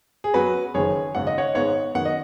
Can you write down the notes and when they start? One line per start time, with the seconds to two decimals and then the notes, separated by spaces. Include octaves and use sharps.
0.24 G#4
0.34 F#2 F#3 B3 F#4 B4
0.74 F#1 F#2 D#3 G#4 C#5
1.15 G#1 F#2 C#3 F#5
1.27 D#5
1.38 C#5 F#5
1.54 G#1 G#2 G#3 B3 C#5 F#5
1.95 F#2 D#3 B3 F#5
2.05 D#5